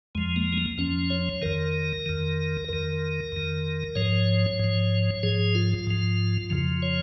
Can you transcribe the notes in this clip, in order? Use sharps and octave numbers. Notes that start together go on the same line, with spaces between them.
F2 F3 G#3
A#3
G#3
A#3
F2 F3 C#4
C#5
F2 D#3 A#4
F2 D#3
F2 D#3 A#4
F2 D#3
G#2 F3 C#5
G#2 F3
G#2 F3 G#4
F4
G#2 F3
F2 C#3 F3
C#5